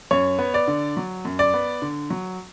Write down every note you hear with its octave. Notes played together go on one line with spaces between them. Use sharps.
F#2 C#5
B3
D5
D3
F#3
F#2
D5
B3
D3
F#3